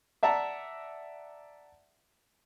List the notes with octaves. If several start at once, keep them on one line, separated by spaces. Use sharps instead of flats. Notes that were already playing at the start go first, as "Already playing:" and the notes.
D5 E5 F#5 A5 A#5